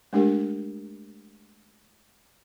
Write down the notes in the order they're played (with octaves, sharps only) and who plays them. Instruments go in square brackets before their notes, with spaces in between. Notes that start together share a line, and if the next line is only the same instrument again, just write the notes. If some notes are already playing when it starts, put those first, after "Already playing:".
[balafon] G#3 A3 D4 G4 A#4